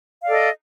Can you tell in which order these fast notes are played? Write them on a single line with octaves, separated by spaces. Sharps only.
F5 D5 A4 D#5